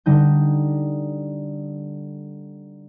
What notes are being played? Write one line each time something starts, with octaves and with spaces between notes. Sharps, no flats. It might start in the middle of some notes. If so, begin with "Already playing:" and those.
D3 G3 D#4 G6